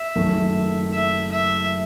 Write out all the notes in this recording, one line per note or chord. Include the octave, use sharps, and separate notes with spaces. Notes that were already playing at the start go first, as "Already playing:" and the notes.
Already playing: E5
F#1 F#2 D#3 A3
E5
E5